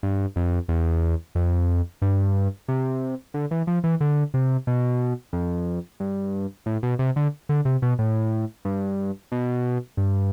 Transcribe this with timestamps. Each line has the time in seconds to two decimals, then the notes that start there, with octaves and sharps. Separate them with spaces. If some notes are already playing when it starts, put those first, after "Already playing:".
0.03 G2
0.36 F2
0.68 E2
1.35 F2
2.02 G2
2.68 C3
3.34 D3
3.51 E3
3.67 F3
3.84 E3
4.01 D3
4.34 C3
4.67 B2
5.33 F2
6.00 G2
6.66 A2
6.83 B2
6.99 C3
7.16 D3
7.49 D3
7.65 C3
7.82 B2
7.99 A2
8.65 G2
9.32 B2
9.97 G2